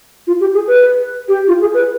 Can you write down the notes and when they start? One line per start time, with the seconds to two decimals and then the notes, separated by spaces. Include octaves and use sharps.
0.27 F4
0.40 G4
0.54 G#4
0.67 B4
1.28 G4
1.48 F4
1.61 G#4
1.74 B4